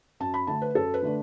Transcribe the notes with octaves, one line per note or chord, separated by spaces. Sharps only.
F#2 A5
B5
D3 A3 D4 A5
B4
F#2 A4
B4
D3 A3 D4